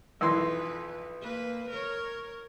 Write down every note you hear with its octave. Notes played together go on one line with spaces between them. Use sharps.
B1 F2 E3 B4 C6
A#3 B4
A#4 C#5